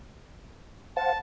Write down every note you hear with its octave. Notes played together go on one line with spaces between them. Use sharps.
C5 F5 F#5 A5